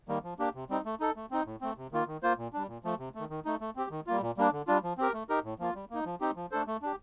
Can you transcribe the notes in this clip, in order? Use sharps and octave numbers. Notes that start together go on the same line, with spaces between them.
D#3 G3 A#3
F3
A#3 D4 G4
C3
G3 C4 D#4
A3
D#4 A4
A3
C4 D#4
A2
A3 C4
C3
D#3 A#3 F4
D#3
A#3 F4 C5
A#2
G3 D4
A#2
F3 A3
C3
D#3 A3
D#3
A3 D#4
A3
C4 G4
D#3
G3 A#3 F4
A#2
G3 A#3 D4
D3
G3 D4 F4
F3
C4 G4 A#4
A3
D#4 G4 A#4
A2
F3 A#3 F4
G3
A#3 D#4
F3
C4 D#4 G4
F3
A3 D4 A4 C5
A3
D4 G4